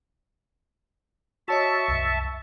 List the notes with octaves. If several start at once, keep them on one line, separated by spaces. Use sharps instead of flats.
F#4 C#5 D#5 E5 A5 C#6
C2 F#2